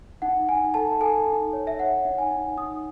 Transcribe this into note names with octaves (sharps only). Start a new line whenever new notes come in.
D#4 F#5
D#4 G#5
A4 A5
A4 G#5
D#4
C#5
E5
C#5 F#5
D#4
G#5
D#4
D#4 D#6